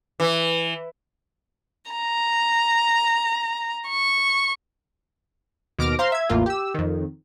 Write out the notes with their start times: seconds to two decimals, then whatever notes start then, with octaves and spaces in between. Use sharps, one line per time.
0.20 E3
1.92 A#5
3.88 C#6
5.79 D#2 B2 D6 F6 A#6 D7
5.99 C5 F5 A#5 C6
6.12 E5 G#6
6.29 A1 E2 A#3 F4
6.46 G4 E6
6.74 F2 D#3